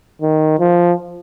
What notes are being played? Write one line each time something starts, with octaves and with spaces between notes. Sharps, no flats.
D#3
F3